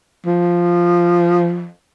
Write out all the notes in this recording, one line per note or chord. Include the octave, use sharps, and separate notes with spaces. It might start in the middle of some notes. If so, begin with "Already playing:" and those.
F3